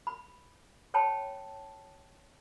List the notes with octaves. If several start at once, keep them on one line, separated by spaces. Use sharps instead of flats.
B5
C5 C#5 G5 A5 B5